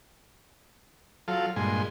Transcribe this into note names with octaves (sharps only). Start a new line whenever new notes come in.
F#3 F4 A4 F5
G2 A#2 G#3 G#5 C6